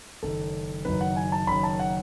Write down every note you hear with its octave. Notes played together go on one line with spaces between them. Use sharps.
F#1 F#2 D#3 A4
F#1 F#2 D#3 B4
F#5
G#5
A5
F#1 F#2 D#3 B5
A5
F#5